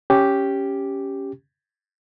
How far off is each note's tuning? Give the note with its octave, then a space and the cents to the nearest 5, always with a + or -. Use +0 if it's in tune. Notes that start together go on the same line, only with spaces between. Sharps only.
C#4 +0 G4 +0